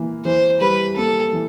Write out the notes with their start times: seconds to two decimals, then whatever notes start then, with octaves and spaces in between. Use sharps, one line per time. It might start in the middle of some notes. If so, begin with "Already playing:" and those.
Already playing: E3 A#3
0.25 E3 C5
0.61 G3 B4
0.97 A#3 A4
1.33 E3